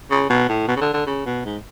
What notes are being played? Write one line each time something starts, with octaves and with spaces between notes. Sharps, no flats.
C#3
B2
A2
B2
C#3
D3
D3
C#3
B2
G#2